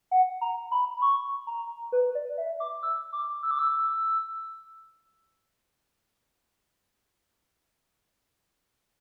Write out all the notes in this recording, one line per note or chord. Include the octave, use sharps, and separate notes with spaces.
F#5
A#5
B5
C#6
A#5
B4
D5
E5
D6
E6
D6
E6
D6
E6